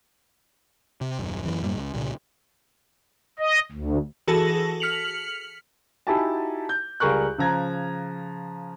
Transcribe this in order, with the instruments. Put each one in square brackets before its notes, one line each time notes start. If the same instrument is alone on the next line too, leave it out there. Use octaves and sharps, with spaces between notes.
[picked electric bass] C3
D#1 F#2
F#2 E3
F#2 A2 G3 A#3
C#2
C2 A#2 C#3
[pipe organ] D#5
D2
[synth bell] E3 F#4 G#4 A4 A5 A#6
F6 B6 C#7 F7 F#7
[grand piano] D#4 E4 F#4 G4 G#5 A5
G6
C#2 G3 G#4 A#4 C#6 F#6
C#3 F3 A#5 G#6